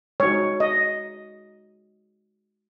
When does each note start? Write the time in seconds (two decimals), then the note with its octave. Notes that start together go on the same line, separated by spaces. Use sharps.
0.20 G#3 D#4 F#4 C#5
0.60 D#5